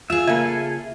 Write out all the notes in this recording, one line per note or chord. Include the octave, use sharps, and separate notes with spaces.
F4 G#4 E5
C#3 A#3 A4 E5 G#5